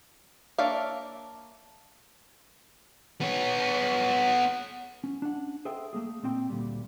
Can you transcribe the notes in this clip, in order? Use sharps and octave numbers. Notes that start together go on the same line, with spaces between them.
A#3 D4 C#5 E5 F5
B3 C#5
C#4
D4 F#5
G#4 A4 C5 E5 G5
A3 A#3 G#4
A#2 A#3 C4 G5
D2 A#2 G3